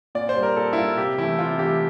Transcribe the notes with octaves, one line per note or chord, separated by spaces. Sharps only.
A#2 D5
C5
G3
A#4
A#2 A4
E4
G3 F4
C3 G4
E3 A3 E4
C3 F4
E3 A3 G4